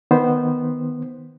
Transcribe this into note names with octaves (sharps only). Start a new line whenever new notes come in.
D#3 B3 C5